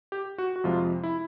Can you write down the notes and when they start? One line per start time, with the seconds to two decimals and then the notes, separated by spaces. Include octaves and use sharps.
0.12 G4
0.38 F#4
0.56 F#4
0.64 F2 C3 F3 G#3 F4
1.03 E4